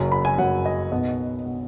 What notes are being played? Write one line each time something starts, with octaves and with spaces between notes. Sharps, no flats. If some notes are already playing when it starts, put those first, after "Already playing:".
Already playing: F#1 F#2 F#3
B5
G#5
F#1 F#2 F#3 F#5
D#5
B1 B2 B3 D#5
B2 B3